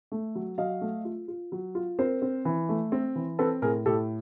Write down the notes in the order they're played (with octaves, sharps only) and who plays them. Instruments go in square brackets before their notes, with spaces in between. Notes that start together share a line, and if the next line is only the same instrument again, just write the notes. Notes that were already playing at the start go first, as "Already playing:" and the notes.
[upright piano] A3
F#3
F#3 D#5 F5
A3
F4
F4
F#3
F4
C4 A#4 C5
C4
E3
A3
C4
E3
C4 A4 B4
A2 G#4 A#4
A2 G4 A4